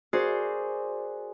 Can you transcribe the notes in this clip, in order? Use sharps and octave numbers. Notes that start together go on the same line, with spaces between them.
F#4 G#4 A#4 C5 D5